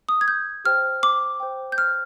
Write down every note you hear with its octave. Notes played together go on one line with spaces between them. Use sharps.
D#6
G#6
G6
G4 C5 G5 F6
D6
C5 G5
G6
F6